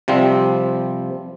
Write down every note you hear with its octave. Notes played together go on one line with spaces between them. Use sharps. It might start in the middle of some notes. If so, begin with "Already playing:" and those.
C3 F3 G3 C4